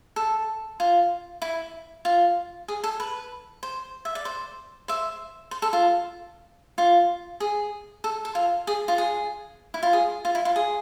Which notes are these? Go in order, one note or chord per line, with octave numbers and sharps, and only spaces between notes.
A4
F4
E4
F4
G#4
A4
B4
C5
E5
D5
C5
C5 E5
C5
A4
F4
F4
G#4
A4
A4
F4
G#4
F4
G#4
E4
F4
G#4
F4
E4
F4
G#4